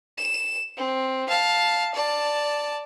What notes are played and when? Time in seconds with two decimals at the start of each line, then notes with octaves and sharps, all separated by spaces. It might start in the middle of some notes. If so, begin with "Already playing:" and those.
0.18 E7
0.77 C4
1.29 F5 A5
1.94 D5 A5